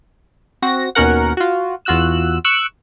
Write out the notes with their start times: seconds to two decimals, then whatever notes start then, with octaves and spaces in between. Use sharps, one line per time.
0.62 C4 F#4 A#6
0.95 D#2 B2 C#4 A#4 F#5
1.37 F4 F#4
1.85 E2 F4 F#4 E6 F#6 E7
2.44 C#6 E6 F#6 C#7 D7